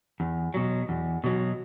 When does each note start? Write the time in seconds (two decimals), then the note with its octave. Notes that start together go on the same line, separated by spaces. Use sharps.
0.20 E2
0.54 B2 F#3
0.89 E2
1.24 B2 F#3